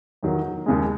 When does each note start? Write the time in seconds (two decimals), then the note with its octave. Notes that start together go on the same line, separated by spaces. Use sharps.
0.23 E2 D#3 F#3
0.66 D#2 C#3 G#3